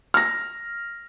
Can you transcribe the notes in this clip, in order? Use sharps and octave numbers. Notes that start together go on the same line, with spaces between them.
F6 A#6